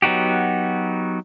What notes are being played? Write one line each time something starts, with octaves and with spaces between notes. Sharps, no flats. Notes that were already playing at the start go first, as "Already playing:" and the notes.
F#3 B3 D#4 F#4 G4